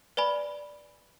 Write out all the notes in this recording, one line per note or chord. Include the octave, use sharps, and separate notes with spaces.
B4 D5 G#5 B5